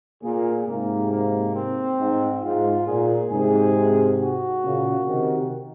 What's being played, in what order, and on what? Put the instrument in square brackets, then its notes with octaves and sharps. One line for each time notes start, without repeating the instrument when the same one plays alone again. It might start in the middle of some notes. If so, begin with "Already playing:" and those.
[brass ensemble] A#2 [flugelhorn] G#4
[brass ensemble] G#2 C3 [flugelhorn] A#3
[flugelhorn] A#3
C4
[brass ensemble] G#2
[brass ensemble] G#2 [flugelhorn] F4
[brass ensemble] A#2 [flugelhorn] G#4
[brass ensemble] G#2 C3 [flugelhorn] G#4
[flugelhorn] F#4
[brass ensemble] A#2 C#3
C3 D#3